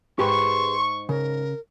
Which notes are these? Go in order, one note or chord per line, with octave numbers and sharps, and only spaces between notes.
G#2 G4 G#4 B4 C6 C#6
C#3 A#4